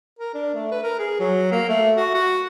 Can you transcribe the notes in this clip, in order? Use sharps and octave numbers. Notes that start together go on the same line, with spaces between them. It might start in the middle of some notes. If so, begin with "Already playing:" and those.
A#4
D4
A3
B4
A#4
G#4
F#3
A#3
A3
F#4
F#4